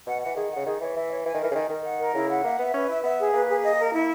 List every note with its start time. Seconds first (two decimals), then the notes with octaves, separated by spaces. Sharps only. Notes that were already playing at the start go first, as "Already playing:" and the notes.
0.07 B2 F#5
0.21 E3 F#5
0.37 D#3 G#4
0.52 C#3 F#5
0.66 D#3 G#4
0.81 E3 C#5
0.96 E3 E5
1.11 C#5
1.25 E3 G#5
1.34 D#3
1.40 E3 A#4
1.51 C#3
1.55 D#3 G#5
1.69 D#3 A#4
1.84 F#5
1.99 A#4
2.14 C#3 E4
2.29 F#5
2.44 A#3 E5
2.59 B3 E5
2.73 C#4 B4
2.89 E4 E5
3.03 B3 E5
3.19 G#4
3.33 A#3 B4
3.48 G#4
3.64 D#5
3.78 A#4
3.93 E4